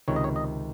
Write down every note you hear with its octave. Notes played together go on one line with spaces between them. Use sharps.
C#2 C3 D#3 C#5
D#5
C#5
D#5